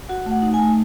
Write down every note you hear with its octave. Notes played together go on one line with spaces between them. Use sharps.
F#4 F#5
A3 F#5
D#4
G#5
A3